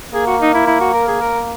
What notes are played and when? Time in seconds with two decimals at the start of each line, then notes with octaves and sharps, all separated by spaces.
0.13 A#3 G#4
0.27 F#4
0.41 D#4
0.54 E4
0.67 E4
0.81 F#4
0.94 A#4
1.08 G#4
1.21 A#4